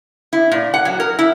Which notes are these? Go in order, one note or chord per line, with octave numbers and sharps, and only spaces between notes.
E4
A#2
F#5
F#3
A#4
E4